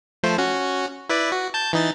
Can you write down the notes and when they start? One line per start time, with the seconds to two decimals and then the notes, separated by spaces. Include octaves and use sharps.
0.23 F3 A3 C5
0.38 C#4 F#4
1.09 E4 B4 D5
1.32 F#4
1.54 A5 G6
1.73 E3 D#4 A6